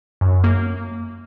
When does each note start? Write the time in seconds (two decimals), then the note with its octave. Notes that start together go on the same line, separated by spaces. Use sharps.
0.21 F#2
0.44 A#3